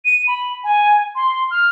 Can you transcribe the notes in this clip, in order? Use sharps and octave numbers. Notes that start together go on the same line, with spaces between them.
D#7
B5
G#5
C6
F6